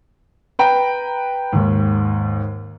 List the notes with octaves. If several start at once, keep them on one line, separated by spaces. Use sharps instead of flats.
B4 G5 A#5
D#2 G#2